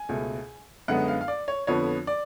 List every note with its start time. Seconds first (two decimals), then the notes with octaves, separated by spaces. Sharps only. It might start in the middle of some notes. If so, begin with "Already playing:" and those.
Already playing: G#5
0.09 C#2 B2 A3
0.88 F#2 D3 G#3 B3 F#5
1.08 F5
1.21 F5
1.28 D5
1.48 C#5
1.67 F2 D3 F3 B3 C#5
2.07 D5